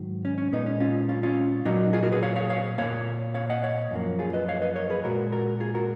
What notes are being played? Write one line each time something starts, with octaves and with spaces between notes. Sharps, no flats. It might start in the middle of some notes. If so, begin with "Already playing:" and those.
Already playing: G#2 D#3 F#3
C#4
C#4
A#2 G#3 B3 D#4
C#4
C#4 F4
C#4 F4
C#4 F4
A#2 F#3 A#3 D#4 F#4
F4 G#4
F#4 A#4
G#4 B4
C#5 F5
C#5 F5
C#5 F5
A#2 F#3 A#3 C#5 F5
C#5 F5
D#5 F#5
C#5 F5
F#2 F3 A#3
F4 G#4
B4 D#5
C#5 F5
B4 D#5
A#4 C#5
G#4 B4
A#2 G#3 F#4 A#4
F#4 A#4
F4 G#4
F#4 A#4